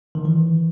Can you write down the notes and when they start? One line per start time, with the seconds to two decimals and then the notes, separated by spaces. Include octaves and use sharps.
0.15 D#3
0.25 E3